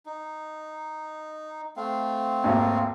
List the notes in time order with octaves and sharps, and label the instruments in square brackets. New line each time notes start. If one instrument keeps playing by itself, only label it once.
[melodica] D#4
A3 C4 F5
[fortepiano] G#1 D#2